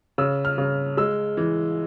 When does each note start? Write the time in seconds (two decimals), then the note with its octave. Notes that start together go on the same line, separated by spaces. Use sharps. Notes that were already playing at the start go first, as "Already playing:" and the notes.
0.18 C#3 E6
0.45 F6
0.58 C#3
0.97 G#3 E6
1.37 E3